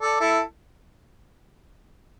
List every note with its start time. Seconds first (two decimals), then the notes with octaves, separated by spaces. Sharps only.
0.01 A4 D5
0.20 E4 A4